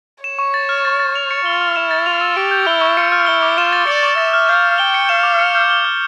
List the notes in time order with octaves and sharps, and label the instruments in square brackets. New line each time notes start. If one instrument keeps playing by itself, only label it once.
[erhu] C#5 [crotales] E7
[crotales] C#6
A6
F6
A6
A6
F7
C#7
[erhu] F4 [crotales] G7
[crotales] F6
[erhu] E4 [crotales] E7
[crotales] A6
[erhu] F4 [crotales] F7
[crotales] E6
[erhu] G4 [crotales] D7
[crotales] G6
[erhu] E4 [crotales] G7
[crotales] C#6
[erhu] F4 [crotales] C#7
[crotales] F6
[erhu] E4 [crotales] G7
[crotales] D6
[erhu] F4 [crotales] E7
[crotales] A6
[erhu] D5 [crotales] C#7
[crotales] C#6
[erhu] E5 [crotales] A6
[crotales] F6
[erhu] F5 [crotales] G6
[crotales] G6
[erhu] G5 [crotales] G7
[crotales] C#7
[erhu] F5 [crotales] E7
[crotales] D6
C#7
G6
G7
F6